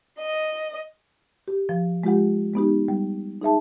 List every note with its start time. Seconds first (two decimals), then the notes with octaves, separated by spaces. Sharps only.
0.17 D#5
1.48 G4
1.69 F3
2.03 G#3 F4 G4 F#5
2.54 G#3 B3 D#4 G4
2.88 G3
3.41 D#4 G#4 E5 A5